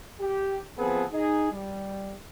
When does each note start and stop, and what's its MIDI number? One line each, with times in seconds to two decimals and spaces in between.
0.21 0.59 67
0.78 1.04 53
0.78 1.04 59
0.78 1.04 60
0.78 1.04 68
0.78 1.04 69
0.78 1.04 71
1.13 1.51 63
1.13 1.51 68
1.52 2.14 55